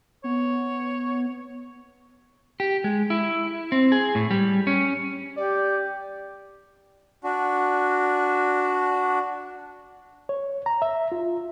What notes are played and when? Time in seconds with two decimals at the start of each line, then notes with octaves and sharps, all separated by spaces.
0.24 B3 C#5
2.60 G4
2.84 G#3
3.10 E4
3.72 C4
3.92 G#4
4.15 A2
4.31 G3
4.67 C#4
5.37 G4 D5
7.24 D4 F#4
10.29 C#5
10.66 A#5
10.82 E5
11.12 F4